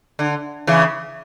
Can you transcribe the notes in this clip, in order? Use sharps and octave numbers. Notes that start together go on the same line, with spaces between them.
D3
C#3 E3